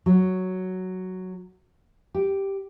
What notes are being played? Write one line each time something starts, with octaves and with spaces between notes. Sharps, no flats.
F#3
G4